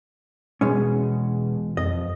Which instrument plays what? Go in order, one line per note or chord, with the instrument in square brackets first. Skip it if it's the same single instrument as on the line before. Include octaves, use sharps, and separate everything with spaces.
[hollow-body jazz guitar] E2 G#3 C#4 [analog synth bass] B2
[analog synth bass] F2 [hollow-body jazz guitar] D#5